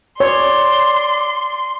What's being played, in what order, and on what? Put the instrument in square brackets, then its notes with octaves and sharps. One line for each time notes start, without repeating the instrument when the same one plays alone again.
[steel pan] C#5 [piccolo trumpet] D5 [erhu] C6